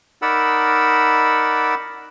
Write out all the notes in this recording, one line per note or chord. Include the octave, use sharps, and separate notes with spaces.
D#4 A#4 D5 F#5 B5 E6